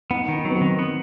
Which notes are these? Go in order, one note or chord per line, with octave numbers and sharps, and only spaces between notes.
B3 D#4
D#3 D#4
F#3
B3
C4
D#3
B3